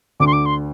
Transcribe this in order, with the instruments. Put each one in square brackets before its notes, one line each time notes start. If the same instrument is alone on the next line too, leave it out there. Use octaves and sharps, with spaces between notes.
[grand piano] D2 D3 [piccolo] D6
[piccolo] C6
D6
C6